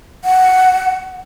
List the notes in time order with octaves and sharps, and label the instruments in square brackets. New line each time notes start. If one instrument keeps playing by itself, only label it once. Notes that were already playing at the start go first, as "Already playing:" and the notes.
[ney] F#5